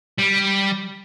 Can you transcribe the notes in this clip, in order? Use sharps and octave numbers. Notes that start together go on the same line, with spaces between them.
G3